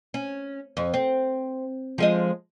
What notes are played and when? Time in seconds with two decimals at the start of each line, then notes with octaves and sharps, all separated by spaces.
0.14 C#4
0.77 F2
0.94 C4
1.98 F3 G#3 D#5